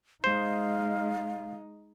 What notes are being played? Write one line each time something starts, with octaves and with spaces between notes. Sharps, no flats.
G#3 D#4 C5 F5